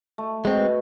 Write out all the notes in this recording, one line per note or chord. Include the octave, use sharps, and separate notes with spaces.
A3
G#3 C4 F#4 B4 D#5